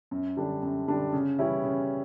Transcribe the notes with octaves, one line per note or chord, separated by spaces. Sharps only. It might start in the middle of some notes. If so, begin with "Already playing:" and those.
F#2
D3 G3 D4
F#2
D3 G3 D4
C#3
E3 G3 C#4 E4
C#3